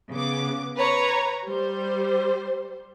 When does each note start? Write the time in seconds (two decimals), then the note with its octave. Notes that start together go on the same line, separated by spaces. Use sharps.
0.10 C#3 B3 D6
0.75 B4 C#5 A#5
1.47 G3 C5